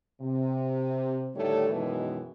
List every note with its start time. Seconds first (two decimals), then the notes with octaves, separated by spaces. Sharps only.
0.21 C3
1.35 A2 D3 D#3 G3 A3 C#5
1.70 F#2 B2 D#3 E3 G#3